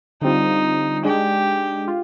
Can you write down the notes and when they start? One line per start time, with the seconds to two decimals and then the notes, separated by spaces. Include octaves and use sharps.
0.22 D3 G3 C4 D#4 F4
1.04 G#3 D4 G4 G#4
1.88 F4